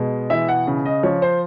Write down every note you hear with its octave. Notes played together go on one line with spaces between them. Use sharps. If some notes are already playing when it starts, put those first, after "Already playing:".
Already playing: B2 G#3
E3 E5
F#5
C#3
D#5
F3 C#5
C5